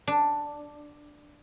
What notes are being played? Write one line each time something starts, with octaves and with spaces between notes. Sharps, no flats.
D4